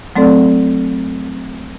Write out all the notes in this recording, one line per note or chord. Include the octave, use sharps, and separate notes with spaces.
F#3 A3 C4 A4 D5